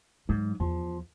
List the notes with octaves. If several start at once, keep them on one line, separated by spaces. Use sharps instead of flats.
G#2 F#3
E2 F3